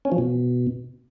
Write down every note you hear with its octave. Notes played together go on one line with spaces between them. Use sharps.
C#4
F3
B2